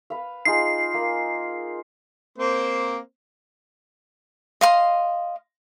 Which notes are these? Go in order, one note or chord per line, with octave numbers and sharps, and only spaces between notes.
B4 F5
D#4 F4 G#4 C7
A#3
A#3 C4 C5
D#5 F5 C6